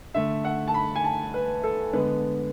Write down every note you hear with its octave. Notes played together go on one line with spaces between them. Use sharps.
D3 A3 E5
F#5
A5
B5
G#5
A5
B4
A4
D3 G#3 B3 B4